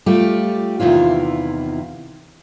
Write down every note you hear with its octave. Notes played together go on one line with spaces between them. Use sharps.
G3 A3 F4 G4
E2 C3 D#3 E4 F4